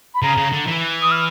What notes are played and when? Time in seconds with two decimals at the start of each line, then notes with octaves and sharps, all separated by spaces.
0.15 B5
0.23 C#3 A#5
0.37 C#3
0.52 D3
0.67 E3
1.02 D#6
1.11 F6